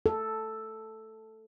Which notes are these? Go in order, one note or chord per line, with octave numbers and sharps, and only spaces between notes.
A4